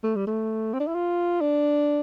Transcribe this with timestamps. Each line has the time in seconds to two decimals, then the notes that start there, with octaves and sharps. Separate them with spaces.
0.03 A3
0.16 G3
0.27 A3
0.73 C4
0.80 D4
0.87 E4
0.94 F4
1.41 D4